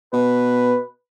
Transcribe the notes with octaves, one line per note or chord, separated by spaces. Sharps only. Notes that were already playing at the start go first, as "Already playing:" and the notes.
B2 B4